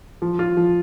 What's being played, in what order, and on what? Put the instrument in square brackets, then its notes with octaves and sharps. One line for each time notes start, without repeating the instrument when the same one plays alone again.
[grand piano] F3
F4
F3